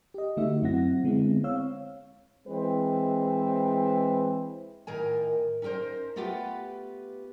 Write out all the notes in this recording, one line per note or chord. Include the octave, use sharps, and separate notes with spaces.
G4 D#5
D3 A3 D#4 F#4 E5
F#2 F#3 C4 E4 F#5 A#6
D3 G#3 B3 C4 E4
C4 C#5 F5 E6
E3 G#3 C4 B4
A2 D#3 A#4 G#5
C#4 D#4 G4 A#4 C5
A3 B3 F4 G4 B4 F#5